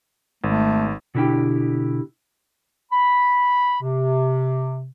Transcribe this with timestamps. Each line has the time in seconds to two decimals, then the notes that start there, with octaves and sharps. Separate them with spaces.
0.44 G#1 A3
1.15 B2 D3 E4 G4 G5
2.91 B5
3.82 C3